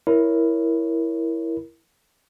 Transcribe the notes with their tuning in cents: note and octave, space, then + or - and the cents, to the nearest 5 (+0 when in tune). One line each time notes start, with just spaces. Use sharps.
E4 +0 A#4 +10 C#5 +5